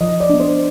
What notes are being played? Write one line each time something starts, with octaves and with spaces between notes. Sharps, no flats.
F3 D#5
D5
B3 D4
C5